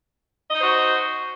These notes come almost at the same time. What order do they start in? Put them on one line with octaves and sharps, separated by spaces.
D#5 D#4 C5 F#4